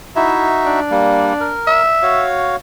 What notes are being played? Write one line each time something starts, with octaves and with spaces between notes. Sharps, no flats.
D#4 E4 F#4 E5
D4
G3 A#3
A#4
E5
F#4 C#5 F5